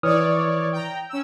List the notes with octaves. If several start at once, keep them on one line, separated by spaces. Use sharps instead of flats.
E3 C#5 D5 D#6 F6
G5 A#5
C#4 E6